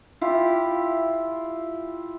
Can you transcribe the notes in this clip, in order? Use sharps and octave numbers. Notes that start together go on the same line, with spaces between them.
E4 F4 G4